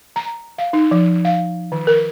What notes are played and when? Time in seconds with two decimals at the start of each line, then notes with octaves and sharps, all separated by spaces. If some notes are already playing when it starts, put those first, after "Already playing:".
0.16 A#5
0.58 F5
0.73 D#4
0.91 F3
1.25 F5
1.72 D#3
1.87 A#4